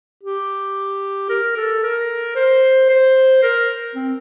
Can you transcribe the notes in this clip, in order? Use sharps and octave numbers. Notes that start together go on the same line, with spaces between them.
G4
A#4
A4
A#4
C5
C5
A#4
C4